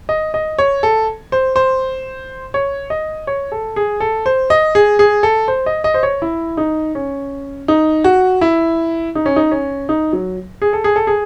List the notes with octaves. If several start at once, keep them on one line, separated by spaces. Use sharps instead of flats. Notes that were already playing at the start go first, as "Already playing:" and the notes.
D#5
D#5
C#5
A4
C5
C5
C#5
D#5
C#5
A4
G#4
A4
C5
D#5
G#4
G#4
A4
C5
D#5
D#5
C5
C#5
E4
D#4
C#4
D#4
F#4
E4
D#4
C#4
D#4
C#4
D#4
F#3
G#4
A4
G#4
A4
G#4